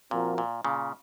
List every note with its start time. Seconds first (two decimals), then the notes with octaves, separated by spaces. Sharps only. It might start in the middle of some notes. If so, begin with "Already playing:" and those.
0.11 A#2 F3 C4 F#4 A#4
0.38 A#2
0.65 A#2 C#3